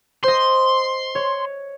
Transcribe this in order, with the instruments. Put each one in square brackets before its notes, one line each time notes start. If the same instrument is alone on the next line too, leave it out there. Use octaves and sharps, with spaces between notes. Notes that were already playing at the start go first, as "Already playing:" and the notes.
[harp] C5 D#5 [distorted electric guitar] C6
[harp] C#5